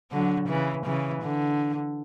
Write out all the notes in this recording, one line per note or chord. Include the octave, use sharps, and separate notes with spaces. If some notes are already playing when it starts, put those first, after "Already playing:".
D3 F#3
C#3 E3
C#3 E3
D3